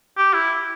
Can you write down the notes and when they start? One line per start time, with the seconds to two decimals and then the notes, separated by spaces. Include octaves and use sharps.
0.17 G4
0.34 E4